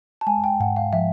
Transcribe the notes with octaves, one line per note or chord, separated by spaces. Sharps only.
A5
G#3 G#5
G5
G#2 F#5
F5
F3 E5